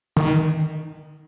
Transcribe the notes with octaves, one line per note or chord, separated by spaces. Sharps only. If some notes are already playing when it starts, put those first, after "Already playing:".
D#3